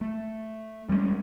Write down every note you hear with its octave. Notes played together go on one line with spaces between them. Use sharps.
A3
G3 G#3 A#3 C#4